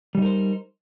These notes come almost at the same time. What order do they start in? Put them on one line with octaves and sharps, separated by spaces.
G3 D#4 A#4 C5